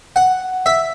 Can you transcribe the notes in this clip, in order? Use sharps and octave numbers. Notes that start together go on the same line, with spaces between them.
F#5
E5